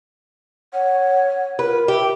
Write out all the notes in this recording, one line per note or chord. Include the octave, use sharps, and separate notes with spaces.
C#5 F#5
F4 A#4 B4
G4 E5